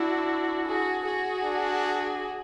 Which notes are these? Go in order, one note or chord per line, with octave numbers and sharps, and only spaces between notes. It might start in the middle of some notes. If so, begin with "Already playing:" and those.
Already playing: D4 E4 F#4
F#4 G#4
F#4 G#4
D4